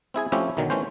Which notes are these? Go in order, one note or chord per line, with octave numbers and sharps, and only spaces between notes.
C4 E4 G#4 G#5
F3 A3 C4 C#4 E4 G4
B1 D3 D#3 F#3
E3 A3 C#4 C5